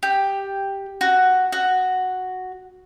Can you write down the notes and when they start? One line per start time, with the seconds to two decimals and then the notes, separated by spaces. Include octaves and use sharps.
0.03 G4
1.01 F#4
1.52 F#4